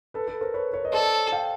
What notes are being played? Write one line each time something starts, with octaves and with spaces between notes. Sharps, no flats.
A4 B4
A4 B4
A#4 C5
B4 C#5
B4 C#5
D#5
A4 C5 D5
F5 G5